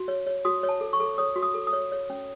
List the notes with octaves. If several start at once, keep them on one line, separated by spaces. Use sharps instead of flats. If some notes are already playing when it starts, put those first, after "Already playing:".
Already playing: F#4
C#5
C#5
F#4 D#6
C#5
A5
A4
C#6
A4
C#5 D#6
F#4
D#6
A4
D#6
C#5
C#5
C#4